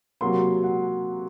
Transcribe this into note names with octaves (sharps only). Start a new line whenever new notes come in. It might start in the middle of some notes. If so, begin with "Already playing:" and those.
C3 F#3 A#3 C6
F#5